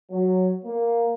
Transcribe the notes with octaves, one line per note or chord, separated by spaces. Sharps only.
F#3
A#3